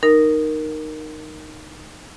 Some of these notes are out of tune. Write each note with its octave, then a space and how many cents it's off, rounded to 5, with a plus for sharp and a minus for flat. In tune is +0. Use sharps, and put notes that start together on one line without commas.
D#4 -15 A#4 +0